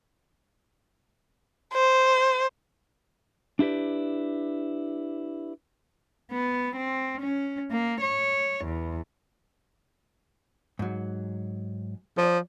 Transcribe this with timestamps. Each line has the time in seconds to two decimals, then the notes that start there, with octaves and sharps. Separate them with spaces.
1.74 C5
3.59 D4 E4 G4 B4 D5
6.32 B3
6.76 C4
7.22 C#4
7.71 A#3
8.01 C#5
8.65 E2
10.79 G#2 F#3
12.18 F3 C#5 D5